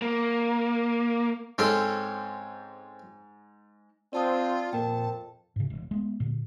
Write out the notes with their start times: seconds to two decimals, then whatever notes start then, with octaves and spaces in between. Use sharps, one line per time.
0.02 A#3
1.58 G#2 C4 C#4 A4
4.13 C4 F4 D5 A5 D#6
4.73 F2 A#2 A#4 G5 A5
5.56 G#2 C#3
5.70 E1
5.91 G#3 A3 B3
6.20 A#2 D3